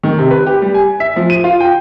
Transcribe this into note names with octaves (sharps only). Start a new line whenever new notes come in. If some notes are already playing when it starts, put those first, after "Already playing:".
D#3
C3
B4
G4
G3
G#5
E5
F3
D#7
F4
G5